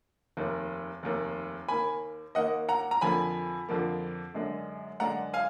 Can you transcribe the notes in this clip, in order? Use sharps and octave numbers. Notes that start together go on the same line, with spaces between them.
F1 D#2 D#3
F1 D#2 D#3
D#2 D#3 A#3 G#5 B5
D#2 D#3 A#3 D#5 F#5
F#5 A#5
A#5
F2 D3 F3 A#3 G#5 B5
F2 D3 F3 A#3
F#2 D3 G#3 D4
F#2 D3 G#3 D4 F#5 A#5
F5 G#5